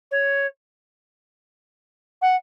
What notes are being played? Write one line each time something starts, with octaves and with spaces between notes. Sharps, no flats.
C#5
F#5